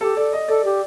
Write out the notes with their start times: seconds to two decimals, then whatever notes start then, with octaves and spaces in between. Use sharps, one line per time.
0.01 G4 A4
0.17 A4 D5
0.33 D#5
0.48 A4 D5
0.65 G4